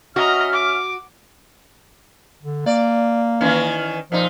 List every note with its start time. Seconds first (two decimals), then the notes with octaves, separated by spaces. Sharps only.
0.16 C#4 F#4 D#5 E5 A#5 F6
0.53 D6
2.42 D3
2.66 A#3 D5
3.41 D#3 E3 C#4
4.12 A#2 F3 D#4